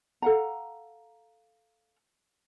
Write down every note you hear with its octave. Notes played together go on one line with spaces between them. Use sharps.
A4 F5 F#5 A#5